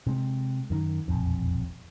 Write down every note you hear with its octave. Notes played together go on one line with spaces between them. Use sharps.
C3 G#3
F#2 D#3
E1 A#1 F2